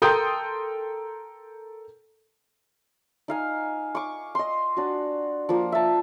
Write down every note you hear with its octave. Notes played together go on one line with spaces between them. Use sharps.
A4 A#4 G5 C6 D#6 G6
D#4 F5 G#5
C#6 D6
D#5 C6
D4 F#4
F3 A#3
E5 A5